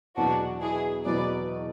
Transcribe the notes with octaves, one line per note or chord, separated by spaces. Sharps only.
E2 B2 F#3 D4 F#4
E4 G#4
E2 B2 F#3 B4 D5